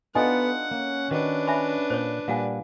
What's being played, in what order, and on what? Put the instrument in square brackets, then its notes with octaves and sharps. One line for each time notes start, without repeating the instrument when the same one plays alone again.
[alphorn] B3 [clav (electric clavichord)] D4 D#4 F4 [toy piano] A4 D#5 G#5 [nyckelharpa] F#5
[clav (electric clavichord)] A#3 [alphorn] C#4
[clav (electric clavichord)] D#3 F#4 [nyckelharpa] D4 B4
[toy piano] E5 G#5 B5
[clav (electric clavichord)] A#2 [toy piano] C5 C#5
[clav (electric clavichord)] A#2 G3 [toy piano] F5 F#5 G#5